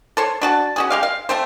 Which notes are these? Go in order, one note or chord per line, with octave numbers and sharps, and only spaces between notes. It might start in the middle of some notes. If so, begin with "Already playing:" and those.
A4 C5 C#5
D4 F#4 A5
C#4 F#4 G#4
G#3 G4 F5
F5
A3 C4 C5